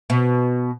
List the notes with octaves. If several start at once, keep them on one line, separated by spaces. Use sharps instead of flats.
B2